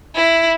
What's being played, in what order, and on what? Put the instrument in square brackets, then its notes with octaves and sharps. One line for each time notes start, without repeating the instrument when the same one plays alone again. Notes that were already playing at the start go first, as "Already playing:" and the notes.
[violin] E4